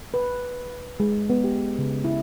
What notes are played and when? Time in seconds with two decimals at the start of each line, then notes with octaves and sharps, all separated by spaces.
0.14 B4
1.00 G#3
1.30 B3
1.44 G4
1.79 C#3
2.04 E4